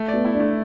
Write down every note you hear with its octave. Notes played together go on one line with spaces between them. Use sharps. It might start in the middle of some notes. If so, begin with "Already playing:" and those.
Already playing: A3
B3 D5
E4
D4
A3